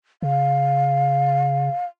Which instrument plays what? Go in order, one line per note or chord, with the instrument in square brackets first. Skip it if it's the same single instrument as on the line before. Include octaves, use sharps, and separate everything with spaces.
[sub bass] C#3 [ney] F5